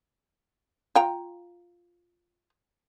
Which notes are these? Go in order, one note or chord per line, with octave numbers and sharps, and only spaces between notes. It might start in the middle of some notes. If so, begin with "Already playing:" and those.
F4 G5 A#5